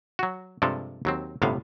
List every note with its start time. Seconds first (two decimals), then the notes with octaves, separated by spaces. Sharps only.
0.19 F#3 F#4
0.62 G2 C3 F3 G#3 A4
1.05 D#2 F#3 C4
1.42 G1 A2 C3 B3 F5